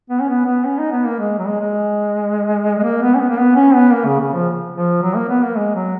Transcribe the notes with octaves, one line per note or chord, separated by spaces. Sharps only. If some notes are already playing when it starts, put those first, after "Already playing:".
B3
C#4
B3
B3
C#4
D#4
B3
A#3
G#3
F#3
G#3
G#3
G#3
A#3
B3
C#4
B3
A#3
B3
C#4
B3
A#3
C#3
C#3
F3
F3
F#3
A#3
B3
A#3
G#3
F#3